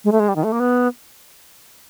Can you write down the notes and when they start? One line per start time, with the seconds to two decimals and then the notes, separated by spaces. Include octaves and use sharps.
0.04 G#3
0.12 A3
0.20 G#3
0.29 G3
0.36 D#3
0.44 A3
0.52 A#3
0.60 B3